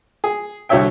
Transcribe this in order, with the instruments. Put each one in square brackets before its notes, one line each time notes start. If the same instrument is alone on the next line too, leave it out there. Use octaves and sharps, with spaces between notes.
[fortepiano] G#4
C2 D3 F#4 C#5 E5 G5